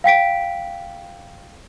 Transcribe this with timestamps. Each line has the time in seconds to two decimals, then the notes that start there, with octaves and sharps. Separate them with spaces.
0.04 F5 G5 B6 D7